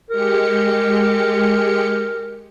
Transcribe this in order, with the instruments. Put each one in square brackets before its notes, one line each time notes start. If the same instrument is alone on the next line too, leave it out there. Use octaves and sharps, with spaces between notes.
[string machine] G#3 G4 C#7 [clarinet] A#4